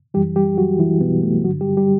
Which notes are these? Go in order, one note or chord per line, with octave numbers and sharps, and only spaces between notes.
F#2 E3 G3 G4
G3 G4
F#3 F#4
E3 E4
B2 B3
A3
G2 D3 F#3 F#4
G3 G4
G3 G4